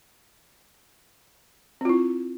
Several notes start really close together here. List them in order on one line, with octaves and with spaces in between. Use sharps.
C4 F4 E4